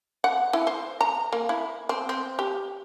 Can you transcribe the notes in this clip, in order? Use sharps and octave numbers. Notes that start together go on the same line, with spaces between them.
F#5
E4
C5
A#5
A#3
E4
C4
C4
G4